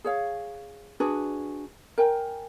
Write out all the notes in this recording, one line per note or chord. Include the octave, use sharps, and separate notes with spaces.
G#4 C#5 F5
D4 F#4 G#4 B4
A#4 G5 G#5